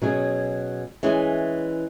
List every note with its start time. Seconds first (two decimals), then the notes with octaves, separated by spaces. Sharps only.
0.02 B2 F#3 C#4 G#4
1.03 E3 G#3 C#4 G#4